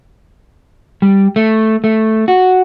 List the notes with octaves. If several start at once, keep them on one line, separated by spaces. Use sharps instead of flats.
G3
A3
A3
F#4